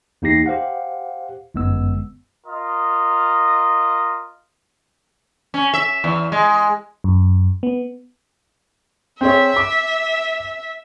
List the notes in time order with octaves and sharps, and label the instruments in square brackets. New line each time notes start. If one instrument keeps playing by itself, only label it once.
[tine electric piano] E2 A#3 D#4 G4 A#6 C7
G4 C5 F5 F#5
G1 F#2 G#3 B3 E6
[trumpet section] F4 A#4 D#5
[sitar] C#4
E5
E2
G#3
[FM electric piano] F#2
B3
[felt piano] C4 G#4 C#5 [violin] E5
[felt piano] D6